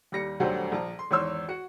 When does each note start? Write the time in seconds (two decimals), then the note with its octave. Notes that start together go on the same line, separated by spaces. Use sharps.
0.12 D#2 G3 A#6 C#7
0.40 D#1 D2 D3 F#3 G4 C5
0.72 A#1 F3 A5 A#5
0.99 C6
1.11 G#1 E2 C#5 C6 E6
1.48 F#4 F#5 C#7